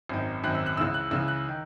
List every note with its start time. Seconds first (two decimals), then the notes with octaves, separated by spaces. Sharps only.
0.09 G#1 F#2 D#3
0.43 G#1 F#2 D#3 F#6
0.55 E6
0.66 F#6
0.77 C#2 C#3 E3 E6
0.94 F#6
1.11 C#2 C#3 E3 E6
1.28 F#6
1.49 D#3